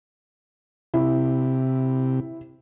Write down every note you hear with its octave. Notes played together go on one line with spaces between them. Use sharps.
C3 E4